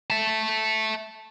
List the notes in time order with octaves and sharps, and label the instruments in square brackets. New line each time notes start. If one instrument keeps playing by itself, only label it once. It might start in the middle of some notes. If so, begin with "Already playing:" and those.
[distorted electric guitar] E5 A5